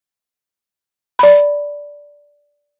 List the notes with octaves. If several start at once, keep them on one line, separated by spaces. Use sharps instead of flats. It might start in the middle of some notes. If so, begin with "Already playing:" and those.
D5 B5